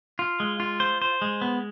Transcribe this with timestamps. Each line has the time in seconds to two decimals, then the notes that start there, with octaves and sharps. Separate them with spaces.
0.19 F4
0.40 G#3
0.60 F4
0.80 C5
1.02 C5
1.22 G#3
1.42 B3